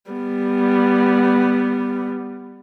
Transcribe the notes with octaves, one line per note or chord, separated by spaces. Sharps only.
G3 B3